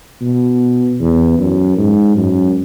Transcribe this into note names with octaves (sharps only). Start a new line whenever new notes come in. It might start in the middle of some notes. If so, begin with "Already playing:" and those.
B2
E2
F#2
G#2
F#2